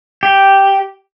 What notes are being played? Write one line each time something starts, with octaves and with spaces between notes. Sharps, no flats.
G4